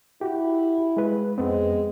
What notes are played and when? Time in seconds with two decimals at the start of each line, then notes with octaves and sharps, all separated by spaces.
0.21 E4 F#4 G4
0.97 G#3 B4
1.38 F2 G#3 B3 C4